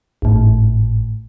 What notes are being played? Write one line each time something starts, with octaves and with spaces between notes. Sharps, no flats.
G#1 A2